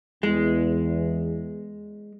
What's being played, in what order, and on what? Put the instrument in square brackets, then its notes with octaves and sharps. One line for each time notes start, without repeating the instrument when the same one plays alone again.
[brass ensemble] E2 [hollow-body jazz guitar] G#3